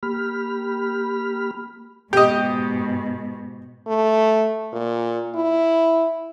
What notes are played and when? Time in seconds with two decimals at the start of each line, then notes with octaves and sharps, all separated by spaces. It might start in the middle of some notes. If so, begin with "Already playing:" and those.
0.03 A#3 G4 B5 F6
2.13 G#2 B2 G4 D#5
3.87 A3
4.73 A#2
5.36 E4